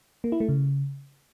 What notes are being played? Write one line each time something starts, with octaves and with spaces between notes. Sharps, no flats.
A#3
E4
A3
C#3